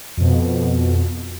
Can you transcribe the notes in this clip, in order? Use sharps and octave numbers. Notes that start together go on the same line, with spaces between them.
F2 B2